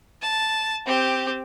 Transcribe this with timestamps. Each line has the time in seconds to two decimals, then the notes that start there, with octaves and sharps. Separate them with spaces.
0.22 A5
0.86 C4 G4